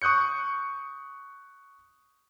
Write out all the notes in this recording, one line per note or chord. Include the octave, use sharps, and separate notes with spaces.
C#6 D#6 F#6 G6 C#7